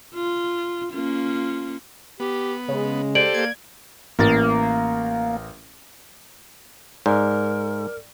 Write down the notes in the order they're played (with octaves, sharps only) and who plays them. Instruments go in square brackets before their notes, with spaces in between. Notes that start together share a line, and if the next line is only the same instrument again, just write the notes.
[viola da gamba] F4
A#3 C#4 F4
[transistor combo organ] B3 [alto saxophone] G4
[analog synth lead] C#3 [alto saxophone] G#3
[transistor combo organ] G4 A4 C5 [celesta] D5 D7 F#7
[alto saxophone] A#3 [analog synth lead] G#6
[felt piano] A1 A#4 A6 [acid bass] A#3
[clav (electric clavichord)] G#2 [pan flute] A#4 [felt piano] D5